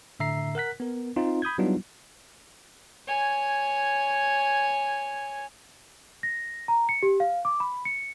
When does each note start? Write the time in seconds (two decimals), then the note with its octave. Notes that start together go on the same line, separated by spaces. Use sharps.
0.20 A2 D3 E5 A#5 C7
0.55 A#4 F#5 F#6 B6
0.80 B3 A#4
1.16 C4 D#4 F4
1.42 B5 D#6 G6 G#6
1.58 F#3 G3 B3 D4 D#4 F4
3.07 C#5 G#5
6.23 A#6
6.68 A#5
6.89 C#7
7.03 G4
7.20 F5
7.45 D6
7.60 B5
7.85 C#7